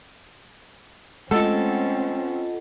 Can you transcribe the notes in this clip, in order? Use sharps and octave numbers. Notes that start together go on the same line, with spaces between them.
G#3 A3 C4 C#4 F4 A4 D#5 F#5